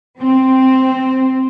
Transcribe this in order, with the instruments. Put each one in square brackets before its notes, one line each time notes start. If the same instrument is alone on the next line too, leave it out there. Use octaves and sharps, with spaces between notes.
[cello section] C4